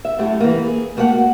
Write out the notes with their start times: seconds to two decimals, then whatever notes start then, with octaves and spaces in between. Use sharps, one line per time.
0.05 E5
0.18 F#2 A2 A3 G4
0.41 E3 A#3
0.66 G#4
0.97 A3 A#3 G4 C#5 F#5
1.11 F#4